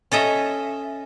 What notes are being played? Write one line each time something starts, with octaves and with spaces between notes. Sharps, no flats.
C#4 A4 D#5 E5